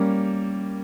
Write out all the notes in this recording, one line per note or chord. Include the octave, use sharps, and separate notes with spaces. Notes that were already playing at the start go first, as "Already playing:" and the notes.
Already playing: G3 A#3 C#4